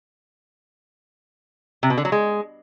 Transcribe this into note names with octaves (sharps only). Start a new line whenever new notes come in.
C3
B2
D3
F#3
G#3